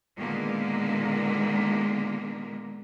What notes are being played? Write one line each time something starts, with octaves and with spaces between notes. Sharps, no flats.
A#2 D3 D#3 G#3 A#3 B3